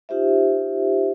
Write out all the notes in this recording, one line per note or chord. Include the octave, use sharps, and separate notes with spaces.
D#4 F4 G4 C5 E5